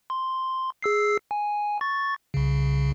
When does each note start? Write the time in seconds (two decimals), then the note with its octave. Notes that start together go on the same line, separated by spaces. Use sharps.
0.10 C6
0.82 G#4 E6 C7
1.31 G#5
1.81 C#6 A6
2.34 C2 C#3